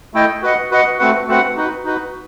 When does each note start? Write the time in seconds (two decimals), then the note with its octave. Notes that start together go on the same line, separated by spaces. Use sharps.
0.14 A3 E4 A4 D#5 G5
0.42 F#4 B4 D#5 F#5
0.71 F#4 B4 D#5 F#5
0.99 A3 C4 F#4 B4 F#5
1.27 A3 C4 F#4 B4 F#5
1.56 D#4 F#4 B4
1.85 D#4 F#4 B4